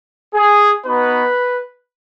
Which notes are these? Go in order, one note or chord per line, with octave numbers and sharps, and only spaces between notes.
G#4
B3 D#4 F#4 B4